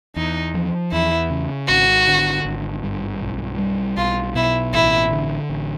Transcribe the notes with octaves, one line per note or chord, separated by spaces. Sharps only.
E2 D#4
F3
E2 E4
C#3
G#1 F#4
D3
G#1
G2
B1
G3
B1 F4
B2 E4
A1 E4
D3
A1